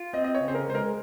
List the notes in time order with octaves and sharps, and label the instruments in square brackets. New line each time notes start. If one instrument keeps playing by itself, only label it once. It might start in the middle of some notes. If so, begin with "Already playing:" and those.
Already playing: [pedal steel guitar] F4
[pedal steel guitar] C4 [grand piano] D#5
[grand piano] D#5
C#5
[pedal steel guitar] C#3
[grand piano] C5
A#4
[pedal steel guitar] G#3 [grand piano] C5
[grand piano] A#4